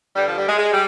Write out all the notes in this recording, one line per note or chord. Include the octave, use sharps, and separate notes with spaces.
G2 D3 G3
F3
G3
G#3
G#3
G3